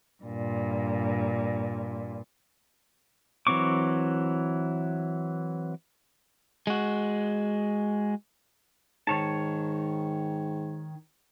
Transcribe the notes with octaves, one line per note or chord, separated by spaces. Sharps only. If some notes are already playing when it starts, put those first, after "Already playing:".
G2 A#2
E3 F#3 C4 C#6 D6
G#3 F#4
G#2 D#3 C#5 A5